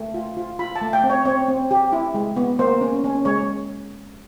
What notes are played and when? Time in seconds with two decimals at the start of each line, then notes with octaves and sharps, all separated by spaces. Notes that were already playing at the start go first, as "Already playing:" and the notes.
Already playing: A3
0.14 F4
0.37 F4
0.59 F4 B5
0.76 A5
0.81 A3
0.93 G5
1.04 C4
1.10 C#5
1.25 C4 C#5
1.48 C4
1.71 G4
1.92 E4
2.14 G#3
2.36 B3
2.59 A#3 C5
2.81 C#4
3.04 C#4
3.25 G#3 C#5